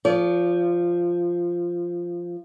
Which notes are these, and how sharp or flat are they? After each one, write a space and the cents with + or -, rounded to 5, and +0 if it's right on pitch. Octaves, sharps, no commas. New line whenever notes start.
F3 -5 D5 -40